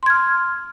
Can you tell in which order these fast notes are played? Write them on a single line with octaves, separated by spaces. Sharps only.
C6 G#6 F6